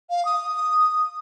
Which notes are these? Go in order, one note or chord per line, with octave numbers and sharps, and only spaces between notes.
F5
D#6